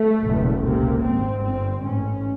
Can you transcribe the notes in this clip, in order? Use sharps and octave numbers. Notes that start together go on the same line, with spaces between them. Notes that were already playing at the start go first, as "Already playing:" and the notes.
Already playing: A3
F#1 E2 B2
C#2 C3 A#3
G#1 G#2 C4
G1 G2 C4
A1 G#2 C#4